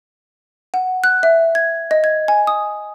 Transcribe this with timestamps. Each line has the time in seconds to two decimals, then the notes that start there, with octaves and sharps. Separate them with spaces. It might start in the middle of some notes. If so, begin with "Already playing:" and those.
0.74 F#5
1.04 F#6
1.23 E5
1.55 G#6
1.91 D#5
2.04 G#6
2.28 G#5
2.47 D#6